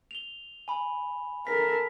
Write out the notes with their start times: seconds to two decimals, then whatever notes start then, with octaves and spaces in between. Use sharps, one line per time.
0.11 F7 G7
0.68 G#5 B5
1.47 A4 A#4 B6